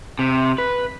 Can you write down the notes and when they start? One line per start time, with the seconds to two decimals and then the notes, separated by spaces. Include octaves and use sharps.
0.19 C3
0.58 B4